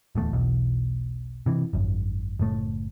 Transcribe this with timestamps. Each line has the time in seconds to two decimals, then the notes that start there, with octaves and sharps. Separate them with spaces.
0.15 D1 E2 A3
0.33 E1 B1 E2
1.46 C3 E3
1.73 G#1 F#2
2.40 F#1 A2 A3